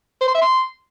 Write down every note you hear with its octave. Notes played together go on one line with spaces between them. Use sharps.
C5
C6
E5
C6